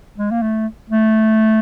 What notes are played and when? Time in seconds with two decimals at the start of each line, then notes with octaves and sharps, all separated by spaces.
0.18 G#3
0.31 A#3
0.42 A3
0.90 A3